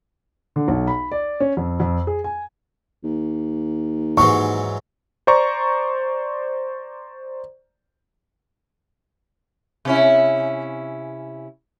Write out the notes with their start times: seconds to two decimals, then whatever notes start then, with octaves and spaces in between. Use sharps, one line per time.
0.56 D3
0.68 B1
0.87 B5
1.11 D5
1.40 C#4
1.57 F2
1.80 F2
2.07 G#4
2.24 G#5
3.04 D#2
4.17 G#2 E3 F#3 C#6
5.27 C5 D5 A#5 C#6
9.85 C3 C#4 E4